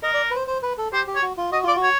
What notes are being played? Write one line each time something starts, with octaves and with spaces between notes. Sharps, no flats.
A#4 D#5
D5
B4
C5
C5
B4
A4
G4 C5
G4
C#5
F#4
F4
F#4 D#5
F4 D5
F#4
C#5